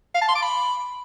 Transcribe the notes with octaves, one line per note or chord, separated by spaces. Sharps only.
F5
A5
C6
D6
B5